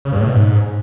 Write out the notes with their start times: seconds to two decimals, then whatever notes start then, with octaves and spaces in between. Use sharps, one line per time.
0.05 C#3
0.12 G2
0.19 A2
0.27 B2
0.34 G#2